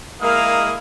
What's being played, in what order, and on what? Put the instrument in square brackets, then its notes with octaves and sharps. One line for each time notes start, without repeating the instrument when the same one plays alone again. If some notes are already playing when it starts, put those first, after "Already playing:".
[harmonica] G#3 A#3 E4 [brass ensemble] A#4 D#5 F5 [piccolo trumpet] D#6